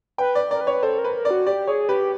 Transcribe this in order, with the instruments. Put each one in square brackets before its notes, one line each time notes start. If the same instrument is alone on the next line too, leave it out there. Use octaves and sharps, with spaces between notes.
[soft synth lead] B4 [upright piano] G5
[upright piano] D5
[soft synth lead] A#4 [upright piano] D5
[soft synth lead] B4
[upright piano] C#5
[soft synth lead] A4 [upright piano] C5
[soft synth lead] A#4
[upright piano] B4
[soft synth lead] A#4
[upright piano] D5
[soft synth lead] F#4
[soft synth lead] G4 [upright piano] D5
[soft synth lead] G#4 [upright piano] C#5
[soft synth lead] G4 [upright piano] B4